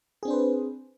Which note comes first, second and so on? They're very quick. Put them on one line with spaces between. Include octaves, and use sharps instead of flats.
G#4 C4 D4 C5 B4